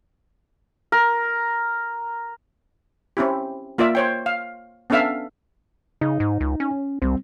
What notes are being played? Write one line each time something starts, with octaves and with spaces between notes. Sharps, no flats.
A#4
C4 C#4 E4 G4
A#3 F4 A#4 D5 E5
C5 C#5 G5
F5
B3 C#4 D4 A4 E5 F5
C#3 D#4
G#2
C#2
C#4
C2 G3 C4